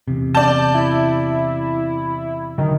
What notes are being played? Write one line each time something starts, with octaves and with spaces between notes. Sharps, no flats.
E2 C3
D5 A5 G6
E4
D3 D#3 F#3